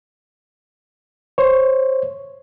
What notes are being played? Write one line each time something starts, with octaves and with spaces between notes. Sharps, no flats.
C5 C#5